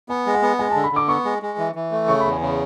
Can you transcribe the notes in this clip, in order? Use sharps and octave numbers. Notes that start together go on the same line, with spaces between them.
B3 G#5
G#3
F#5
B3
G#3 G#5
D3 A5
B5
D3 D6
B3 C#6
G#3
G#3
E3
E3
A3
C#3 C#6
E2 B5
G#5
C#3 B5